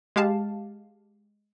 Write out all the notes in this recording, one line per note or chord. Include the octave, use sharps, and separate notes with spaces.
G#3 G4 F5 A5